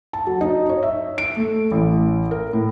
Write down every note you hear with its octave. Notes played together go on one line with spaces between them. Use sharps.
A5
F#3
D#4
C#5
E5
D7
A3
A1
A#4
A2